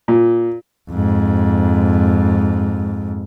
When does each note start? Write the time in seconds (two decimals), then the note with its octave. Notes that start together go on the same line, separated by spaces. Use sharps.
0.08 A#2
0.90 F2 G#2